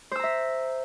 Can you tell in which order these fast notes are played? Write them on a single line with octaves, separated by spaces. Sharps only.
C5 E6 A#5 E5